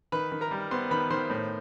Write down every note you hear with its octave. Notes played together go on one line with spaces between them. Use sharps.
D#3 B4 B5
D#3
A#4 A#5
G3
B3 C5 C6
D#3 B4 B5
D#3 C5 C6
A2